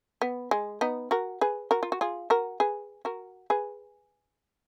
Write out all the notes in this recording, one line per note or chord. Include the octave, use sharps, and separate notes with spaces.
B3
G#3
B3 D#4
F#4 A#4
G#4 B4
F#4 A#4
F4
F#4
F4 G#4
F#4 A#4
G#4 B4
F#4 A#4
G#4 B4